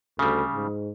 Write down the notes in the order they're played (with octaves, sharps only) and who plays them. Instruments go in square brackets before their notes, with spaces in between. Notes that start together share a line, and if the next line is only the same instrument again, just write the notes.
[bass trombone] D2 [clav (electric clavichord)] C#3 G3
[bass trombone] G#2